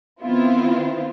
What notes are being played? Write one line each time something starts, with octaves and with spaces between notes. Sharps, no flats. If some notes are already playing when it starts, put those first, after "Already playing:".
D#3 B3 C4 E4 F4